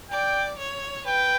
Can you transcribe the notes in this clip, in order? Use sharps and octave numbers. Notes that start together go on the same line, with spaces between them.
D5 G5
C#5
B4 G5